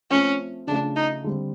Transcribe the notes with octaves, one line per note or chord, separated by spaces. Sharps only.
F3 A3 C4 C#4
C#3 F3 A3 D4
D#4
D3 G3 C4